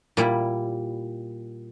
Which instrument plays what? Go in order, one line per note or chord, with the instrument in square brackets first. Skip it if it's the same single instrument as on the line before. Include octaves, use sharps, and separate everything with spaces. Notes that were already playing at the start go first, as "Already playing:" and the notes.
[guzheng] A#2 G3 E4